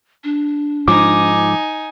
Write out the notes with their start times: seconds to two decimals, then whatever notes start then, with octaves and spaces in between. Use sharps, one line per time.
0.24 D4
0.88 G#2 F3 D#4 G#5 D6